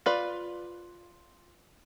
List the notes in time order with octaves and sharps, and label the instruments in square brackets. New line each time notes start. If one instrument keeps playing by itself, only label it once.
[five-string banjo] F4 B4 D5